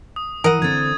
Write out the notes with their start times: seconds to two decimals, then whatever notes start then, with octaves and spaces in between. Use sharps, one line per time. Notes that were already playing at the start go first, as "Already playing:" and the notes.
0.16 D#6
0.44 E3 A#4 F#5 D#6 D#7
0.62 D3 C4 G#6 A6